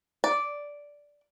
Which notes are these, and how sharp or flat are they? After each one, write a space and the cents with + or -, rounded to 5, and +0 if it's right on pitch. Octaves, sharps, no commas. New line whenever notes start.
D5 -5